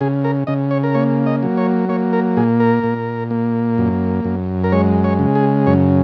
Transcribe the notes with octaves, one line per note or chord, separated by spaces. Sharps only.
C#3 G#4
A#4
C#3 D#5
C#5
A#4
A#3 C#5
D#5
F#3
C#5
A#3 C#5
A#4
A#2 G#4
A#4
A#2
A#3
F#2
F#2
A#4
G#3 C#5
C#5
C#3
G#4
F#2 C#5